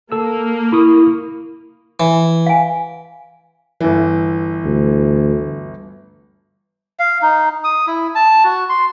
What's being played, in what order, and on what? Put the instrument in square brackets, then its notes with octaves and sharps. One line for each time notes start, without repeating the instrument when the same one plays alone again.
[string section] A#3 [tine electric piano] A4 E6
[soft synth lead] E4 [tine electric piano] B5 C#6 D#6
[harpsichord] E3
[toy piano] F5 G#5
[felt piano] G1 E3
[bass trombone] D2
[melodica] F5
D#4
D#6
E4
A5
F#4
C6